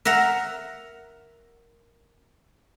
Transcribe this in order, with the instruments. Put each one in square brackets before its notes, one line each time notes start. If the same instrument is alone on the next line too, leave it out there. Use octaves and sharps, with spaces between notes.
[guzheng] A#4 E5 F#5 A#5